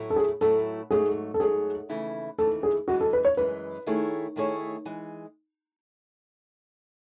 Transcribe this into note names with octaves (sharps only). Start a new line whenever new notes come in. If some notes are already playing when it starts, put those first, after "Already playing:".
Already playing: A2 F#3 A3 E4
A4
G#4
A2 F#3 A3 E4 A4
G#2 F#3 A3 G#4
A4
G#2 F#3 A3 G#4
D#2 C#3 E3 A3 E4
D#2 C#3 E3 A3 E4 A4
G#4
F#2 E3 G#3 F#4
A4
B4
C#5
F#2 E3 G#3 B4
D#3 A3 E4 G#4 C#5
D#3 A3 E4 G#4 C#5
E3 G#3